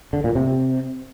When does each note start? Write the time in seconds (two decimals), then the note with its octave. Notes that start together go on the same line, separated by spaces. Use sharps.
0.13 D3
0.24 A#2
0.35 C3